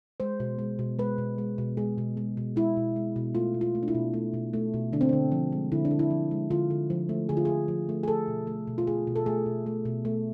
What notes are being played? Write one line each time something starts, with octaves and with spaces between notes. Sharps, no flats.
G#3 C5
B2
G#3
B2
G#3 B4
B2
G#3
B2
G#3 G#4
B2
G#3
B2
G#3 E4
B2
G#3
B2
A3 F4
B2
F4
A3
D4
E4
B2
A3
B2
A3
B2
D3 D4
C4
D3 D4
F3
G#3
D3 E4
D4
D3
E4
F3
G#3
D3 F4
D3
F3
A3
D3 G#4
F4
D3 G#4
F3
A3
G#4
A3 A4
B2
A3
B2
F4
A3 G#4
B2
A4
A3 G#4
B2
A3
B2
A3